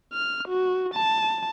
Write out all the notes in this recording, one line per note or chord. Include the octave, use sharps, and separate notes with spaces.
F6
F#4
A5